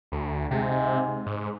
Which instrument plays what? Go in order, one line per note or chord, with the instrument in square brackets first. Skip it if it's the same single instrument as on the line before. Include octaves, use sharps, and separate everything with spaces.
[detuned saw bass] D2
[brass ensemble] G#2 G#3 [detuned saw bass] C3
[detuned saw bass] G#2